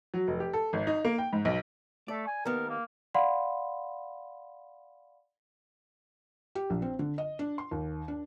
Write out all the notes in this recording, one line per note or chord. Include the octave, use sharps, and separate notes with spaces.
F#3
F1
G4
A4
G#1
D#4
A#3
G5
G#2
B1
A3 D5
G#5
D#2 B3 A#4
A#3
D5 F5 F#5 B5 C6
G4
A#1
C4
D3
D#5
D4
C6
D#2
D4